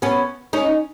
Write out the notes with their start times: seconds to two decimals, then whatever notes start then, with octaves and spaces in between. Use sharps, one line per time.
0.02 B3 C#4
0.53 C#4 D#4